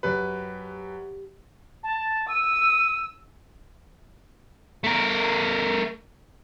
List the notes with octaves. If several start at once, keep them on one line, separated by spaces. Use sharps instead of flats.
F#2 G4 B4
A5
E6 D#7
A3 A#4